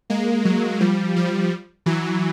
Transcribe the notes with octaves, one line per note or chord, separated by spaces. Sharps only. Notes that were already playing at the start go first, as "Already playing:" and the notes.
G#3 A#3
F#3 G#3
F3 G3
F3 G3
E3 F#3